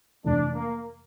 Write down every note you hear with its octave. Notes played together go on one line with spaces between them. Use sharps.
F2 C3 E3 A3 D4
A#3